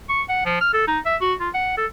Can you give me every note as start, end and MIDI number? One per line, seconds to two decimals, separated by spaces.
0.09 0.22 85
0.29 0.42 78
0.45 0.56 53
0.61 0.70 89
0.73 0.85 69
0.87 0.99 63
1.05 1.16 76
1.21 1.33 66
1.40 1.49 65
1.54 1.75 78
1.77 1.86 69